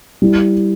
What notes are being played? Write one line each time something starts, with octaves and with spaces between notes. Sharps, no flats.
G3 E4